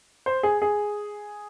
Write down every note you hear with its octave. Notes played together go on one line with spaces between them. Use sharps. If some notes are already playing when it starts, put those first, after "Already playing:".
C5
G#4
G#4